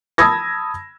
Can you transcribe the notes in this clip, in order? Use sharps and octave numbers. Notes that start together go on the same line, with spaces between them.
A5 B5 D#6 E6 G#6 A#6